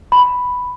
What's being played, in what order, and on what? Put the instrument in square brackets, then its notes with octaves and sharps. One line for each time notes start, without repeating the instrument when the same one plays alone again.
[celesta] B5